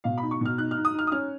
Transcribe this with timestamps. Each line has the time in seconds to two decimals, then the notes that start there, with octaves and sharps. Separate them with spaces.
0.04 B2 F5
0.18 D#4 B5
0.31 C#6
0.41 B2 F6
0.58 D#4 F#6
0.71 F6
0.77 D#4
0.85 D#6
0.94 D#4 F6
1.07 D#6
1.12 C#4 F6